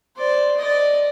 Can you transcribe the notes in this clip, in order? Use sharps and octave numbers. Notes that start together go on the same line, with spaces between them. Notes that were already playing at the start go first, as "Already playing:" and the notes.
C5 D5
D5 D#5